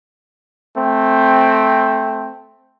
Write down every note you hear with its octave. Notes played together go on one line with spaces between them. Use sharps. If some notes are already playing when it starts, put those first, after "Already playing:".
A3 C4